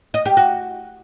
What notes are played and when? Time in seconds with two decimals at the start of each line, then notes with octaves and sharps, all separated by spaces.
0.14 D#5
0.26 G4
0.37 F#4